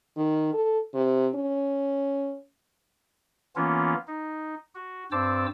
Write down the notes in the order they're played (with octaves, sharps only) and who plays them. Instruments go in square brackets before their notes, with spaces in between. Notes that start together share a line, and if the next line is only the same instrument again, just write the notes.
[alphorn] D#3
A4
C3
C#4
[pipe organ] E3 A#3 B3 C#4 F4
D#4
F#4
G2 C4 C5 A5 D6 E6